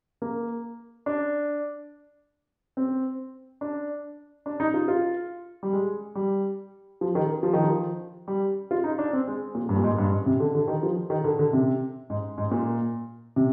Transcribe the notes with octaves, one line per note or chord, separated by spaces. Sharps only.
A#3
D4
C4
D4
D4
D#4
F4
F4
G3
G#3
G3
F3
D#3
F3
D#3
F3
G3
F4
D#4
D4
C4
G#3
A#2
G2
A#2
G#2
G2
G#2
C3
D3
D3
D#3
F3
D#3
D3
D3
C3
G#2
G#2
A#2
C3